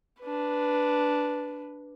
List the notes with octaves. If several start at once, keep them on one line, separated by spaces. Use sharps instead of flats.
D4 B4